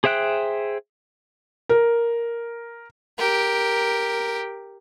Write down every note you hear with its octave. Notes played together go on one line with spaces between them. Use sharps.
G#4 C5 E5 G5 F#6
A#4
G4 A#4